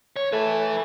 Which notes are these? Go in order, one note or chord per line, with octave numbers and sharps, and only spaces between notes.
C#5
A3 B4 E5